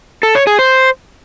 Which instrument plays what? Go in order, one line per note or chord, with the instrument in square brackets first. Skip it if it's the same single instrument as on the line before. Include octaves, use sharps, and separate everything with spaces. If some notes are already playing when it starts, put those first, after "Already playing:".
[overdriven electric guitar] A4
C#5
G#4
C5